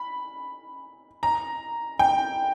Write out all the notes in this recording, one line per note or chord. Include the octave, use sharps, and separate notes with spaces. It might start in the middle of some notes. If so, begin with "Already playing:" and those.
Already playing: B5
A#5
G5